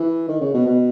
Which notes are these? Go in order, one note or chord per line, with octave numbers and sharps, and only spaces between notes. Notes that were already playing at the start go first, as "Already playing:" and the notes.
Already playing: E3
D#3
C#3
B2
B2